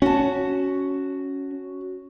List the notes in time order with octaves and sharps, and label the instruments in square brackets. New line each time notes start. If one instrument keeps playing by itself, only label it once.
[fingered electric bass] C#4 [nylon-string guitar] F#4 A5